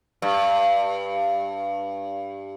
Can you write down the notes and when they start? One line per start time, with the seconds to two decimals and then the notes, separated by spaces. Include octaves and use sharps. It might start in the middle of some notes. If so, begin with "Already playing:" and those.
0.22 G2